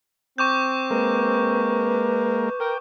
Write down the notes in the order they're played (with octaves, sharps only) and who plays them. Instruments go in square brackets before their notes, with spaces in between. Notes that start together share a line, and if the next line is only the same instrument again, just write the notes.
[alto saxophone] C4 [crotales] C#6 D6 G6
[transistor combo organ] G#3 A#3 A#4 [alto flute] B4
[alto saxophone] A#4 [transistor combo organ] G5